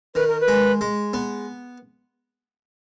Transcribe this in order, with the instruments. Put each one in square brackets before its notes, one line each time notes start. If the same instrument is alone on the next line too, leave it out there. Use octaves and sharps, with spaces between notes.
[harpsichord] D#3 [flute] B4
[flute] A#4
B4
[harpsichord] G#3
G#3
B3